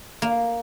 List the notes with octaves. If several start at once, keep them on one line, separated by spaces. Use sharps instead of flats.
A#3